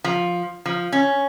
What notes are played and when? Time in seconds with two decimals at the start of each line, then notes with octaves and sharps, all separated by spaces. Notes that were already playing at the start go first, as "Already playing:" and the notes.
0.04 F3
0.66 F3
0.92 C#4